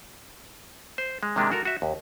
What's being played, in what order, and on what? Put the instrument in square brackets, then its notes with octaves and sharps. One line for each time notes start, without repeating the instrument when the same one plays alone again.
[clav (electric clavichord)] C5
G#3
C3 D#3 G#3 A#3 D4
F#4 A4 A#4
F#4 E5
D#2